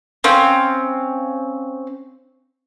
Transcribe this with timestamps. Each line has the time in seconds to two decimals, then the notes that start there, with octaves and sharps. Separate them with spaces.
0.24 C4 C#4 F5